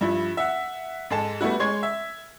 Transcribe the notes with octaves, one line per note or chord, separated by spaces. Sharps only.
G2 F3 E4
E5 F#5
G#2 G#3 A4 A5
G3 A3 B3 E4 F#4
G#3 C#5 C6 G#6
E5